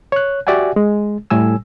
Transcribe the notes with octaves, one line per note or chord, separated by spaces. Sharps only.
C#5 F#6
F#4 G4 D5 E5 F#5 G#5
G#3
A2 G3 G#5 E6